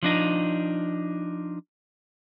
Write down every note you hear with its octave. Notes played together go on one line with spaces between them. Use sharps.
F3 D4 D#4